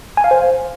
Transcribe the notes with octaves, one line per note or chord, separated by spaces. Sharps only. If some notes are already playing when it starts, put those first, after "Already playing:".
G#5
F5
C5